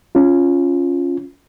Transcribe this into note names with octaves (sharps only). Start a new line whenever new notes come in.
C#4 F4